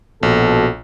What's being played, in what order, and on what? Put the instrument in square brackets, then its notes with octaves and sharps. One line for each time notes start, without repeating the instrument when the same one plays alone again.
[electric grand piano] A#1 [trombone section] B2 F#4 A4